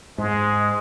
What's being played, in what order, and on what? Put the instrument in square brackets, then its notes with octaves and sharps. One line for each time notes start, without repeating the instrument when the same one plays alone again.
[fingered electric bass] G#2 [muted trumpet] G#3